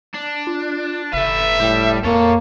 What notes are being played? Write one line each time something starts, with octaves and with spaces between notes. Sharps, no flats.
D4
F4
F#1 A4 B4 E5
A2 G3
F2 A#3 A4 C#5